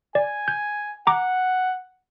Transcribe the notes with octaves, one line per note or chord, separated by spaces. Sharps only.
D5 G#5
G6
F#5 A#5 D6